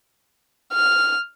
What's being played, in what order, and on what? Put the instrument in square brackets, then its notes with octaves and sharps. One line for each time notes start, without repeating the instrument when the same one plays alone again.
[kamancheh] F6